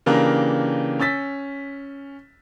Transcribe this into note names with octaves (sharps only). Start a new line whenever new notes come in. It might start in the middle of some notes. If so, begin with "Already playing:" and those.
C#3 E3 A#3 D4 G4 A#4
C#4 E6 A6 B6